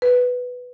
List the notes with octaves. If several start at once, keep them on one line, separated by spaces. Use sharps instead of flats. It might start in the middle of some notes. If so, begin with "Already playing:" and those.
B4